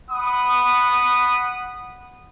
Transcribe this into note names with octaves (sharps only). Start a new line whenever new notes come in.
F#5 B5 D#6